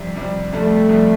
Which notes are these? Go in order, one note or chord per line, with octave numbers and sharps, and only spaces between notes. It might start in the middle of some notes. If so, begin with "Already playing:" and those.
Already playing: F2 C3 G3
F2 C3 G3
F2 C3 G3 A3
F2 C3 G3